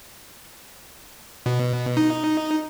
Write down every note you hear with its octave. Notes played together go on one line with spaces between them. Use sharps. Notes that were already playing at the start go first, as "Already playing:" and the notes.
B2
D#4